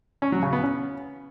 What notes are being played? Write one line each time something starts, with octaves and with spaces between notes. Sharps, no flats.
C#4
F#3
C#3
B3
C#4